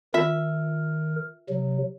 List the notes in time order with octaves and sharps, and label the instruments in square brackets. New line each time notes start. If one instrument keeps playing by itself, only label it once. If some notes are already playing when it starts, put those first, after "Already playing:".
[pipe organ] D#3 A#4 [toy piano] F4 [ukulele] E5
[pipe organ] C3 F#3